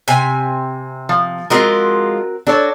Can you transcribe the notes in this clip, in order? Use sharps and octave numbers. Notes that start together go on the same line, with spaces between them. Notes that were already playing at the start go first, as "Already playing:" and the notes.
C3 G#5
F3
F3 G#3 C4 F4 F#4 A#4
D4 F#4 A4 C#5